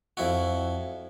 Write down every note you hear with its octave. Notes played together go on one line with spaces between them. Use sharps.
F2 E4 F#4